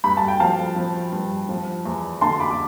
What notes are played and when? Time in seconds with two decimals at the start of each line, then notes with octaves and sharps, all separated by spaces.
0.04 G2 B5
0.17 A5
0.28 G5
0.40 F3 F5 A5
0.76 F3
1.12 G2
1.49 F3
1.86 E2
2.21 D3 A5 C6
2.40 B5 D6
2.51 D6